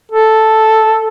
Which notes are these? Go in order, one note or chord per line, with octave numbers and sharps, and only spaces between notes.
A4